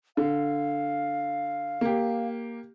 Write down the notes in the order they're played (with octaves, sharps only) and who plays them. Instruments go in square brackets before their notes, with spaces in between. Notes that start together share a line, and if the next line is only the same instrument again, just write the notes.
[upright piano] D3 [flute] F5
[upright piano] A#3 G4